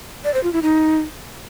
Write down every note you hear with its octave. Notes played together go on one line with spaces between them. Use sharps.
D5
C5
F4
E4
D#4